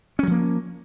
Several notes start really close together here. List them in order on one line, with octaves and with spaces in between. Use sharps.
C#4 F#3 F3 A#3